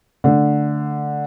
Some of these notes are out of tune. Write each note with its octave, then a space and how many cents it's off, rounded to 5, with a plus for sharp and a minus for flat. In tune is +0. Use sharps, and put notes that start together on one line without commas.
D3 +0 A3 +0